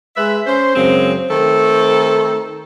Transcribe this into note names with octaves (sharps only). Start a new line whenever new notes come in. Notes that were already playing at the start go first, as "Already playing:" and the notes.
G#3 B4 E5
C#4 C5
F#2 C#3 F#3 G#3 C4
D#3 A3 C4 A4